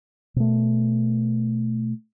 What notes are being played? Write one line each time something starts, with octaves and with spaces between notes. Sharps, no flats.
B2 A3